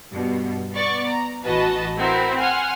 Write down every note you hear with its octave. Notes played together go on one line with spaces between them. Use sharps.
G2 B2
B3 D5 C#6
A#5
A1 E3 F#4 B4 D#5 A5
C4 E4 F#4 A#4
F#5 G#5 C6 F6